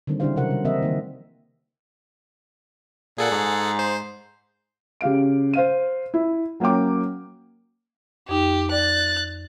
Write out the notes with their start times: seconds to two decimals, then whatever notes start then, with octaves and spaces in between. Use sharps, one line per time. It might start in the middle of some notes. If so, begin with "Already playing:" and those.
0.07 D3 D#3 G3 C4
0.20 C#3 D4 E4 G4 C5 F5
0.36 C3 F#3 A#4 F#5
0.51 G3
0.65 E3 A#3 C4 A#4 D#5 E5
0.82 D#3 A#3
3.18 A#2 G#4 A4 F#5
3.31 G#2
3.79 C5
5.01 C#3 G4 F5 D7
5.54 C5 F5 D#7
6.14 E4
6.60 F#3 A#3 C#4 G5 D6
8.29 F2 D#4 G4
8.72 D5 F#6 A6